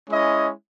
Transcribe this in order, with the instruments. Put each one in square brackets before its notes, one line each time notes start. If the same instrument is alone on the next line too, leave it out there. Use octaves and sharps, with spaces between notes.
[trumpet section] G#3 C#4 E4 D#5